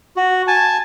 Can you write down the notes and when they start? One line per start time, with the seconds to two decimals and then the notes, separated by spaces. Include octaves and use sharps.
0.16 F#4
0.48 G#5 A5